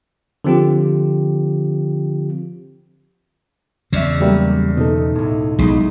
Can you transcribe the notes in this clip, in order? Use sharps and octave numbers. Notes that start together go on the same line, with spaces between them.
D3 F3 C4 F4 G4
E2 C#3 C#5 D5 E5
F#3 G3 A3 A#3
B2 D#4 A4
C#2 A2
B1 F#3 G#3 B3 D#4